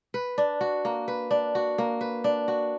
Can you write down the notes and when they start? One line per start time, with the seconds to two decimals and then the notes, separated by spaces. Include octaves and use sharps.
0.14 B4
0.38 D4
0.61 F#4
0.85 A#3
1.08 B4
1.31 D4
1.55 F#4
1.78 A#3
2.01 B4
2.24 D4
2.48 F#4